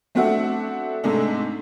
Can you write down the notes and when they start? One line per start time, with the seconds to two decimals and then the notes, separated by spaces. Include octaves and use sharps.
0.15 A3 C4 D4 F#4 E5 F#5
1.04 G#2 C3 G#3 A3 D4 D#4